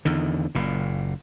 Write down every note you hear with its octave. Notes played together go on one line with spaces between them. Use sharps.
E2 D3 D#3
F#1 A#2